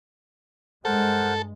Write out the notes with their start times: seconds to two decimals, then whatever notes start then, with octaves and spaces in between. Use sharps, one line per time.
0.85 G2 G#3 A4 A#4 C5 F#5